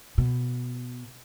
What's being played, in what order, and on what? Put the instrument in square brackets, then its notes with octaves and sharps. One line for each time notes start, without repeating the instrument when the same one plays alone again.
[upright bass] B2